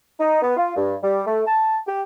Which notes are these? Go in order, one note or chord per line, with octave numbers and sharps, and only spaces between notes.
D#4
B3
F4
G2
G3
A3
A5
G4